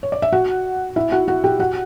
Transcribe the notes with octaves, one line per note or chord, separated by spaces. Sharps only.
C#5
D5
E5
F#4 F#5
E4 E5
F#4 F#5
F#4 F#5
G4 G5
F#4 F#5